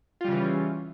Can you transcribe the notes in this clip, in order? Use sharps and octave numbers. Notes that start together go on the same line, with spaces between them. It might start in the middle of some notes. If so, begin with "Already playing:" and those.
C#3 E3 G3 C#4 F4